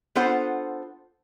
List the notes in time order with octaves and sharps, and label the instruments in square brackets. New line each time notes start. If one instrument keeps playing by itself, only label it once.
[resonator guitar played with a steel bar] B3 D4 F4 A4 C5 F#5